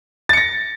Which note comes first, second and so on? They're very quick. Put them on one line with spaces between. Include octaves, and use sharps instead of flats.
A6 C#7 A#6